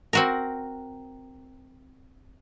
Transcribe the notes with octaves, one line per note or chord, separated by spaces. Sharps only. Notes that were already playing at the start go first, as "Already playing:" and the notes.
C4 F#4 A#4